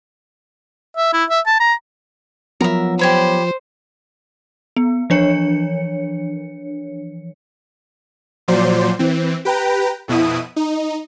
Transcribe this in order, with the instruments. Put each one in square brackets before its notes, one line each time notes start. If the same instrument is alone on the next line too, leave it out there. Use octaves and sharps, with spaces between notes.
[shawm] E5
E4
E5
A5
A#5
[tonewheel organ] F3 [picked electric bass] F#3 B3 [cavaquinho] A#4 E5
[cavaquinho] G4 C#5 B5 [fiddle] C5
[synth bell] B3
E3 F3 D4 C#5 C#7
[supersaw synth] A#2 F3 F#3 C5 D5 C6
E3 C4
G4 B4 G5 A#5
F2 B2 E4 D#6 D#7
D#4